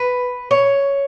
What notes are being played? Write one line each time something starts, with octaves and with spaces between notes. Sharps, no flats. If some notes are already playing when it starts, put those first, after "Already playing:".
Already playing: B4
C#5